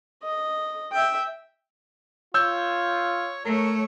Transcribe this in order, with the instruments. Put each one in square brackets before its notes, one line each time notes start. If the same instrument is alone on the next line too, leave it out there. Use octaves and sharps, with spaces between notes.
[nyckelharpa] D#5
E5 G5
[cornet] F4 [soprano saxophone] C#5 [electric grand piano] E6 G6
[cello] A3 C#5 [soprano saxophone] A#4